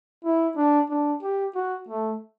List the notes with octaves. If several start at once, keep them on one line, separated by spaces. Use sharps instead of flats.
E4
D4
D4
G4
F#4
A3